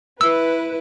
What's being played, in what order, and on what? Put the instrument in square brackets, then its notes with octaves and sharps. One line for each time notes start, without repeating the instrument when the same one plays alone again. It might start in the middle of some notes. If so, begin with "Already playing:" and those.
[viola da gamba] E4 [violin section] B4 [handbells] E6